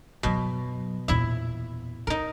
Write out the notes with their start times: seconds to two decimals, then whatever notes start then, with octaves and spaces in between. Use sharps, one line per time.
0.23 F#2 B2 F#3
1.08 E2 A#2 E4 E5
2.07 C4 D#4 A#4